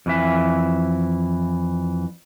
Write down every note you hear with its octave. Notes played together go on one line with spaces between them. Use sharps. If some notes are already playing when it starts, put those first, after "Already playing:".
F2 E3 E5